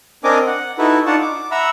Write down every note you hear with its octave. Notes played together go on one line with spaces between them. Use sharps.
C4 D4 A#4 D#5 G#5 D6
F#5
D#4 E4 F#4 A4 B4
D4 D#4 F4 F#5 A5 C#6
D6
E5 F#5 A#5 B5 E6